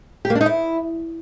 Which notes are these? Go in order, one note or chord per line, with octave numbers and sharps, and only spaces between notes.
G4
A#3
D4
D#4
E4